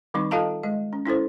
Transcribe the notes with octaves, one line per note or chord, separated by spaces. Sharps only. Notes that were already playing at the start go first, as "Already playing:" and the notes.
D#3 G3 C4 D#4 C#6
F4 A4 D#5 F5 A5 A#5
G#3 D#5
C#4
C#4 E4 A4 C5